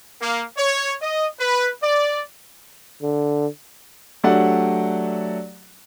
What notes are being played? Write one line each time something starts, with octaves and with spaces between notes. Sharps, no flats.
A#3
C#5
D#5
B4
D5
D3
F#3 A3 D4 G4 D5 F#5